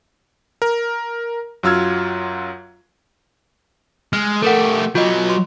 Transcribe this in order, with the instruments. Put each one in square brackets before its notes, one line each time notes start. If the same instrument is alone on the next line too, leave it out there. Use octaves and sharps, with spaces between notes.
[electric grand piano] A#4
F#2 F#3 F4 E6 F6 G#6
[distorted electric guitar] G#3 [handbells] F6
[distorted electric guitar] A3 G4 [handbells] A4 A#4 F#5
[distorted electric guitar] F#3 B4 [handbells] F4 D#5
[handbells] C6